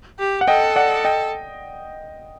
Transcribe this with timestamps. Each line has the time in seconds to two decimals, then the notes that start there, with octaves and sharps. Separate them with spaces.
0.19 G4
0.41 F#5
0.48 A4 D#5 G5
0.76 D5 F#5
1.04 D#5 G5